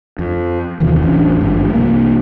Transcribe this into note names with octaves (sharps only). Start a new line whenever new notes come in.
F2
D#2 C3 D#3 E3
A1 E2 C#4 D4
G#1 G2 F3
C2 A#3